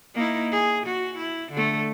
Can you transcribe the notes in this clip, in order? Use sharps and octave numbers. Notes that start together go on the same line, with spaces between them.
A#3 D#4 E4
G#4
F#4
E4
D3 A3